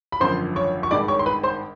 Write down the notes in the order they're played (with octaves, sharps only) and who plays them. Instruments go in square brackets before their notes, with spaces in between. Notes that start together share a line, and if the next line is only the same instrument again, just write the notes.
[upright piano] B5
G#1 F#2 D3 F3 C5 C6
C#5 C#6
C#6
G#1 G2 D#3 G#3 D5 D6
C#5 C#6
C6
B4 B5
C5 C6